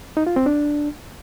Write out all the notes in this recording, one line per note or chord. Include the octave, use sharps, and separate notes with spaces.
D#4
F4
C4
D4